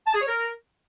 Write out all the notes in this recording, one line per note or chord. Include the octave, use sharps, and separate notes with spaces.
A5
G#4
C#5
A#4